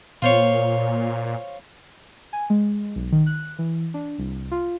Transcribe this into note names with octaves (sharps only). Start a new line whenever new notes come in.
A#2 F4 C5 C#5
G#5
G#3
B1
D#3
F#6
E3
D4
C2
F4